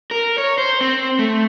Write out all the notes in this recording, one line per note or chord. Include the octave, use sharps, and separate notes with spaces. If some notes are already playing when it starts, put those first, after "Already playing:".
A#4
C#5
C5
C4
A3